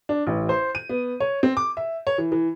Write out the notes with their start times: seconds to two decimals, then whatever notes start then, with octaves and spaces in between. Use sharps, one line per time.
0.09 D4
0.27 A1
0.49 C5
0.75 D#7
0.89 B3
1.20 C#5
1.43 C4
1.57 D6
1.77 E5
2.07 C#5
2.18 E3
2.32 E3